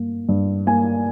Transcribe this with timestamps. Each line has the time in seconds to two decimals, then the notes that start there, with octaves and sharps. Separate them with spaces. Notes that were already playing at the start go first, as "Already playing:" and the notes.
Already playing: G2 A#3
0.29 G2
0.67 A#3 G#5